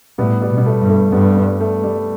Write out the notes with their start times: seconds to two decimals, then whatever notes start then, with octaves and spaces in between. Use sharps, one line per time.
0.18 A2 G3 B3
0.42 G3 B3
0.50 B2
0.58 G3
0.66 A3
0.81 G2
0.89 A3
1.12 G2 G3 B3
1.37 G3
1.60 A3
1.84 G3